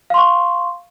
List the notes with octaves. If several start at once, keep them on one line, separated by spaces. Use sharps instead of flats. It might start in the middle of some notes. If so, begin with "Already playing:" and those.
F5 C6 C#6